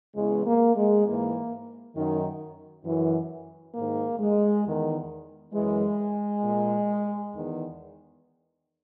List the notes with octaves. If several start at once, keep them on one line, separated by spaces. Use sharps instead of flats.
E2 C#3 E3 G#3
A#3
G#3
G#2 E3 A#3
F#2 D#3
F#2 E3
G#2 D#3 A#3
G#3
E2 D#3
F#2 E3 G#3
A#2
E2 D#3